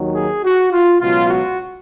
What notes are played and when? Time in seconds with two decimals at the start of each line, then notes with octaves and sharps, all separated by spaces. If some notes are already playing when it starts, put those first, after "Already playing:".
Already playing: D#2 D#3 F#3
0.16 G#4
0.44 F#4
0.73 F4
1.01 C#2 B2 F#3 F4
1.29 F#4